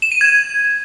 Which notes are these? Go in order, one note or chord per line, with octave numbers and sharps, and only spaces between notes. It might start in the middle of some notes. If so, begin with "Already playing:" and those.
E7
D#7
G#6